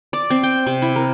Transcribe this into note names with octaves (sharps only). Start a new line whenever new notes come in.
D5
C4
G5
C3
E4
A#4